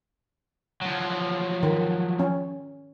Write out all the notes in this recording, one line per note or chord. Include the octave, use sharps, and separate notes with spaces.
F3 F#3
D#3
C#4